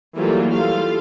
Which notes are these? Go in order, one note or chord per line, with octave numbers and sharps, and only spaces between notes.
E3 F#3 G3 A3 A#3 F4
G3 F4 A4 F5